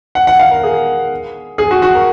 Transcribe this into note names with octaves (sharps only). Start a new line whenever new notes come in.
F#5
F#5
F5
A#4
G#4
G#4
F#4
F#4
A#4